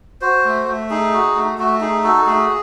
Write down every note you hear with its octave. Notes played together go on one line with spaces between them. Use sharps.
F#4 C5
A3
A3
D#4 G#4
F#4
A3
A3 F#4
D#4 G#4
F#4 A4
A3 G#4